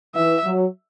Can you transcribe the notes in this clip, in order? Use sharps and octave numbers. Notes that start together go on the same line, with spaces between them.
E3 E5
F#3